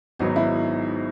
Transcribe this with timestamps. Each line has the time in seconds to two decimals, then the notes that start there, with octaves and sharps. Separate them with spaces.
0.19 G#1 G#2 F#3 B3 D#4 F#4
0.36 E4